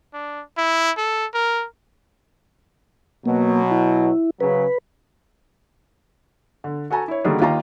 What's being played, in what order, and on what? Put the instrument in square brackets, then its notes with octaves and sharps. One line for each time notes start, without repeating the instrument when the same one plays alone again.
[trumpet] D4
E4
A4
A#4
[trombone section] B2 F#3 [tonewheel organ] A#3
[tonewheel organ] E4
[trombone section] C#3 F#3 [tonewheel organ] B4
[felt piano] D3
F#4 A4 G#5 A#5
E4 C#5
D3 D#3 G3 A#3 F#4 G#4
D#2 D#3 F4 G4 D#5 A#5